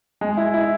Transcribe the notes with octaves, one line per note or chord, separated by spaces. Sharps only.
G#3
E4
E4